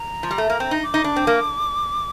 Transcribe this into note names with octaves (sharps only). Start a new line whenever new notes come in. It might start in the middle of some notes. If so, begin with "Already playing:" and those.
Already playing: A#5
F3
G3
A3
A#3
C4
D#4
D6
D#4
D4
C4
A#3